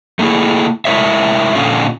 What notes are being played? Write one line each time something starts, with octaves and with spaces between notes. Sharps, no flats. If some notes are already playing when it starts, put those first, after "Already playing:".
A3 A#3 D#4 E4 G#4
G#3 E4 A#4 C#5 E5
A#2 D3 C#4 F4